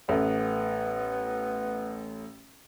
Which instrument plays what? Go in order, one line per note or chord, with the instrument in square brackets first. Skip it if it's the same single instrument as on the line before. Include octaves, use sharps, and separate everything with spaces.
[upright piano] A1 A3 [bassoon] B3